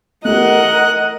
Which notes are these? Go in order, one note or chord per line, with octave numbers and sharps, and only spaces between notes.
A3 G4 A#4 D#5 F#5 F#6